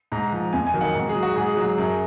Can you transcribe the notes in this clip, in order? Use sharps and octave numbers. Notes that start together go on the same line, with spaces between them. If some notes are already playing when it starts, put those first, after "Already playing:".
G#2 A#5
F3
F2 G#5
G#5
D#3 F#3
F#5
G#2
G#4
F#3
F#4
G#2 G#4
F#3
F#2